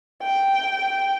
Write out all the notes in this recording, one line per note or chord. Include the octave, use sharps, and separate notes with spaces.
G5